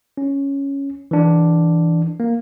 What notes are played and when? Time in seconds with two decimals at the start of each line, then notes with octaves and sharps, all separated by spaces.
0.17 C#4
1.11 E3 D4
2.20 A#3